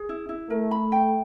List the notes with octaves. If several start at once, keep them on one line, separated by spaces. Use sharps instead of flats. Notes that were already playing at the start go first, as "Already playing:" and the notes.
Already playing: G#4
E4
E4
A3 A#4
B5
G5